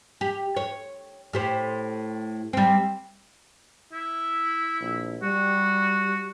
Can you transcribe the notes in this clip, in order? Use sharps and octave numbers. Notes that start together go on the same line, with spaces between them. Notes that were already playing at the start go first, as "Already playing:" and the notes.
G4
C#5
A2 G4 C5
G3 C4
E4
A#1
G3 F#4